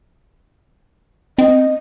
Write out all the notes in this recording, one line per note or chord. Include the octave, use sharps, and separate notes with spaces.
C4 D#5